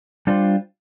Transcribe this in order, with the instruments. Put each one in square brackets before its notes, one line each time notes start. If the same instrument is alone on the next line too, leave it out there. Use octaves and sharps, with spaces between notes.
[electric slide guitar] G3 D4 F4 C5